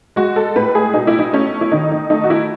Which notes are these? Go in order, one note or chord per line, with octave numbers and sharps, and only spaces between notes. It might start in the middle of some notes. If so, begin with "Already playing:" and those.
G#3 F#4
A4
A2 B4
G#4
B2 D#4
E4
D#4
A3 C#4
E4
D#3 D#4
D#4
A3 D#4
F#4
E4